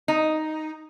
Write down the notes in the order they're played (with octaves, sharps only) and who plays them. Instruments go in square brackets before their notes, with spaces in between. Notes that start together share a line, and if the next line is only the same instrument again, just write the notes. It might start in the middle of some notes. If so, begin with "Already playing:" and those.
[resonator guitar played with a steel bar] D#4